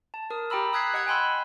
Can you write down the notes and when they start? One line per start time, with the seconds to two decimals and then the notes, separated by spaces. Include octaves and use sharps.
0.14 A5
0.30 A#4 D#6
0.50 G4 G5 A#5 B5 E6
0.73 D#6 E6 F#6 G#6 B6 C7
0.94 D#5 F#5 F#6 G#6
1.07 G5 G#5 B5 C6 E6